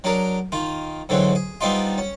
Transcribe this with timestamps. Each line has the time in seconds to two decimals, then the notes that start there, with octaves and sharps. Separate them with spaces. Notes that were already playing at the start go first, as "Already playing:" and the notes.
0.04 F#3 D4 G#4 A#4
0.52 D#3 F4
1.09 G#2 D3 E3 F#3 C4
1.35 G#4
1.61 G3 B3 C4 D4 D#4 F4
1.98 C#4